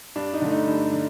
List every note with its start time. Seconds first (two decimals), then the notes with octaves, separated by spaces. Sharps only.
0.15 G2 D4
0.33 D#4
0.41 D3 A3
0.50 D#4
0.68 G2
0.93 D3